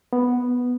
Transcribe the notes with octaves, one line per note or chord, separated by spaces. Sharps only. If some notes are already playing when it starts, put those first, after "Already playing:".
B3